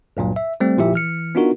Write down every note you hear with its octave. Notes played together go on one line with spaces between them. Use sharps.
C#2 G2 A#2 F#3
E5
G3 A3 C4
G1 A#2 F3 E4 G4 E5
E3 F6 C#7
B3 D4 D#4 F4 F#4 A#4